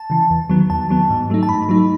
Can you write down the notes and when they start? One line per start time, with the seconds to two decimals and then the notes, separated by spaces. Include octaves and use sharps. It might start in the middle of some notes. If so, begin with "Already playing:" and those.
Already playing: A5
0.10 C#3 E3
0.30 E2
0.50 D#3 F#3 B3
0.70 E2 A5
0.89 D#3 F#3 B3
1.10 G#2
1.30 F#3 A3 D#4
1.43 A5
1.49 G#2 B5
1.69 F#3 A3 D#4